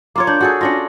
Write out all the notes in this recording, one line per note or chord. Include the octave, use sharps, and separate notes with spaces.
A#3 F4 C#5 D6
D4 G6
F#4 G#4 A4
C#4 D4 F4 A#6